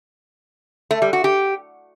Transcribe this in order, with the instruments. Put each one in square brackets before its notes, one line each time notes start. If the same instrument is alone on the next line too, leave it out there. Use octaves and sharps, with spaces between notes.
[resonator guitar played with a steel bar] A3
G3
F#4
G4